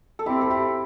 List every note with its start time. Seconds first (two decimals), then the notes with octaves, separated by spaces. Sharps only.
0.19 A4
0.26 C4 E4 G4
0.41 A4
0.50 E4 G4